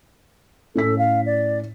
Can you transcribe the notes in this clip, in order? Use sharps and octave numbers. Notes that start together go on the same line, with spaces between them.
A2 C#4 A4 B6
F5
D5